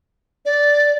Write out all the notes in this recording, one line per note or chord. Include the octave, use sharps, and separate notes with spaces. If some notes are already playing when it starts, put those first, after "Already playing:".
D5